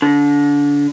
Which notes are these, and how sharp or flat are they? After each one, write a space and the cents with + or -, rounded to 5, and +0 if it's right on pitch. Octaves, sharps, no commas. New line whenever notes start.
D3 -30